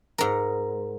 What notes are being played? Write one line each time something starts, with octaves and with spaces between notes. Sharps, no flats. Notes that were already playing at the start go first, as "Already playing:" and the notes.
G#2 A#4